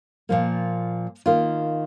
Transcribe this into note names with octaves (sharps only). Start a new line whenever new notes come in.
A#2 F3 A#3
D#3 A#3 F4